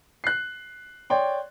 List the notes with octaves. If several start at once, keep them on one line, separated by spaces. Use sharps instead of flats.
F#6 C7
C#5 D5 G5 C6